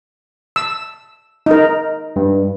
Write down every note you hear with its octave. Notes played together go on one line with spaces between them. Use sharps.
E6
D#4 A#4
G2